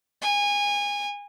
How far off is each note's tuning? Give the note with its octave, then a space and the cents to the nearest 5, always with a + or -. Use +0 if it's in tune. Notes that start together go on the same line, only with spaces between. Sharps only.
G#5 -25